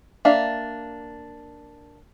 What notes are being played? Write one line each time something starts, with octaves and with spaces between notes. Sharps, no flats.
A#3 D4 E5 F5